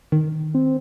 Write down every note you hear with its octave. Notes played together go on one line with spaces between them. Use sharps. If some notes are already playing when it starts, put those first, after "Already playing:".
D#3
C4